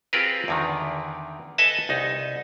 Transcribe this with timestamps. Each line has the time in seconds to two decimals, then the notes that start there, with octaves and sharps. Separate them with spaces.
0.13 C4 F4 G4 G#4 A#4 B4
0.48 E2 D3 D#3
1.58 A4 B4 D#5 E5 G#5 A5
1.89 C2 D#4